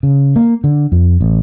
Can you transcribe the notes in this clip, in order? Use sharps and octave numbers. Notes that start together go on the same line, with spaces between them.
C#3
A#3
D3
F2
A1